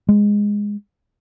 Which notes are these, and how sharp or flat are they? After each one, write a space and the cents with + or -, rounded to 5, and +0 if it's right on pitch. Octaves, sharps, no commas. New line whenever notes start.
G#3 -10